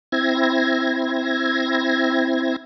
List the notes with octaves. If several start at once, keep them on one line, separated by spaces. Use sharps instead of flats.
C4 E4 G#6 A#6